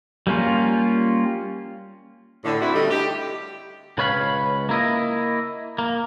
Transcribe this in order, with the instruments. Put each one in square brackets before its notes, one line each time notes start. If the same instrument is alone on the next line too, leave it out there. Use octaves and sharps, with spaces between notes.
[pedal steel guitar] G3 A#3 C#4 F4
[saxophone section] A2 D3
C4 E4 F#4
D3 G3 A3 D#4
G4
[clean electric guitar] C#2 B4 C#5 F5 B5
A#3 E4 D#5
A#3